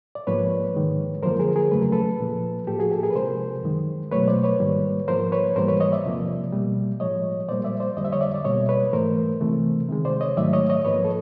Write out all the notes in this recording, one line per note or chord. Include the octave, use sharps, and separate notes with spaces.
D5
G#2 F3 A#3 B4 C#5
G#2 D#3 G#3
F#2 D3 F3 A#3 A#4 C5
G#4 A#4
G#4 A#4
E2 C#3 F#3 A3 B4
A#4
A4 B4
A#2 F3 A#3
A2 F3 A#3 G4 A4
F#4 G#4
G4 A4
G#4 A#4
B4
C3 F3 G#3 A#4 C5
F#2 D#3 G#3
B2 F#3 A3 B4 C#5
C5 D5
B4 C#5
G#2 D#3 G3 A#3
G#2 F3 A#3 A#4 C5
B4 C#5
G#2 E3 G3 A#3 A#4 C5
B4 C#5
C#5 D#5
D5 E5
E2 C3 F3 A#3
B2 G3 A#3
A2 F3 G#3 C#5 D#5
A#2 G3 A#3 C5 D5
D5 E5
C5 D5
F2 D3 G3 D#5
E5
C#5 D#5
D5 E5
D5
B2 G3 A#3 C#5 D#5
B4 C#5
G#2 E3 A3 A#4 C5
C3 E3 A3
C3 D#3 G#3
C5 D5
C#5 D#5
G#2 D#3 F#3 A3 D5 E5
C#5 D#5
C#5 D#5
G#2 F3 A#3 B4 C#5
A4